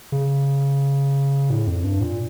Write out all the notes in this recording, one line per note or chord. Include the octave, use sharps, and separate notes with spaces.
C#3
A2
F2
G2
A#2